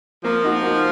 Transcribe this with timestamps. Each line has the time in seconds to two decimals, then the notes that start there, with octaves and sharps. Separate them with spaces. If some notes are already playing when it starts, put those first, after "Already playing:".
0.24 F3 A#3
0.44 D#4 F#4
0.62 A#3